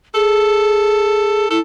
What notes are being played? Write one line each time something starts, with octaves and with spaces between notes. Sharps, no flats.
G#4 A4
E4 A4